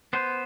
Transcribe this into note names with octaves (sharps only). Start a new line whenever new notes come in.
B3 C5